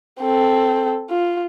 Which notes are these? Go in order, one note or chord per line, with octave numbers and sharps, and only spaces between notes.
C4 A4
F4